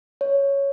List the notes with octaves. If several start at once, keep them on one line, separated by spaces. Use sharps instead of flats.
C#5